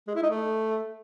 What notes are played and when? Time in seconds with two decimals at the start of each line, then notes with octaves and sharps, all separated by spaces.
0.07 G#3
0.15 E4
0.23 D#4
0.30 A3